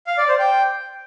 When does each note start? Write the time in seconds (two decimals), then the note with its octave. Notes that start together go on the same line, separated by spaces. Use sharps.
0.07 F5
0.18 D5
0.28 C5
0.39 G5